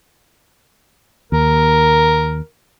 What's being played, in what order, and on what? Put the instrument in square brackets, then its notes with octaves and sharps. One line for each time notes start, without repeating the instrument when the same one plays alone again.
[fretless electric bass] D#2 [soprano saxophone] A#4